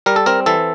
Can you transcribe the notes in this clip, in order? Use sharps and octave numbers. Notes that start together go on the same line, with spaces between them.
G3 A#4
A4
C4 A#4
E3 A4